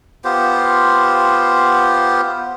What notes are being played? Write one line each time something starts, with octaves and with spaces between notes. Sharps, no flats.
B3 F4 G4 C5